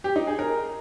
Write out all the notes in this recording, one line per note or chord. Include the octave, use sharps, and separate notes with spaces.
G4
D#4
G#4
A#4